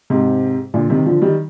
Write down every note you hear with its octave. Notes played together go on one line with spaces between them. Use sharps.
G#2 C3
A#2 D3
C3 D#3
D3 F3
D#3 G3